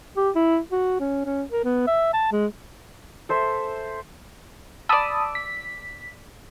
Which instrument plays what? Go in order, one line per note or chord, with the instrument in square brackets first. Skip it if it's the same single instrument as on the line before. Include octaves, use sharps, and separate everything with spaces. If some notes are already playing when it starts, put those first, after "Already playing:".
[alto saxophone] G4
E4
F#4
C#4
C#4
A#4
B3
E5
A5
G#3
[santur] A4 C5 E5
[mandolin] D5 E6 [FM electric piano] A5 B5 D#6
[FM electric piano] B6